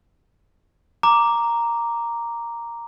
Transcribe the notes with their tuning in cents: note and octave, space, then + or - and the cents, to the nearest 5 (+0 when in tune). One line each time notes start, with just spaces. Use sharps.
A#5 +0 D6 +0